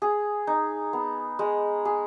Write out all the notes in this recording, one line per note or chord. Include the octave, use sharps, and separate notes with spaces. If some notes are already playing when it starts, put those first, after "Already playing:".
G#4
D#4
B3
G#3
G#4